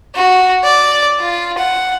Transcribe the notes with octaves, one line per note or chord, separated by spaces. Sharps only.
F#4
D5
F4
F#5